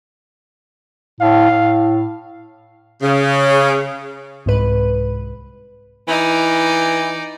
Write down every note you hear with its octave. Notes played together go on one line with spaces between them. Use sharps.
A2 F5
A2
C#3
C2 G#2 B4
E3 D#4 D5